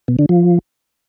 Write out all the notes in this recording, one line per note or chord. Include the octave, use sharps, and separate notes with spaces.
B2
D3
F3